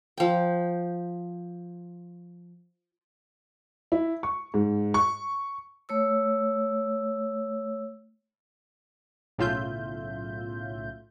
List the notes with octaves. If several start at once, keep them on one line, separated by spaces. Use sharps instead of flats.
F3 G5
E4
C#6
G#2
C#6
A3 C#5 E6
B1 A2 C#3 F4 E5 G6